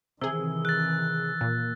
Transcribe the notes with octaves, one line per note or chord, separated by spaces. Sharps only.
C3 D#3 E3 G#4 E6
F#6 A6
A#2